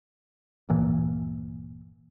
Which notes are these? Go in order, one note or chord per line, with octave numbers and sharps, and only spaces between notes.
D1 G1 A#2 E3